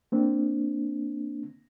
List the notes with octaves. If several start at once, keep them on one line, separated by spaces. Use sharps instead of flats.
A#3 C4 D4